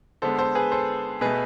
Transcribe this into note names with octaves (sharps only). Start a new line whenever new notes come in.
D3 G#3 B3 A4 C5
A4 C5
G#4 B4
A4 C5
B2 A3 G#4 B4